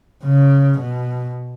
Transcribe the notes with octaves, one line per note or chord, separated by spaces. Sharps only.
C#3
B2